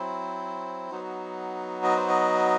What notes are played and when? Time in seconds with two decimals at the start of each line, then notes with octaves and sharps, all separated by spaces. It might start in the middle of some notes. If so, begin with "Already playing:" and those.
Already playing: F#3 C4 E4 C5
0.91 F#3 B3 D#4 F#4
1.84 D#5
1.96 C5
2.09 D#5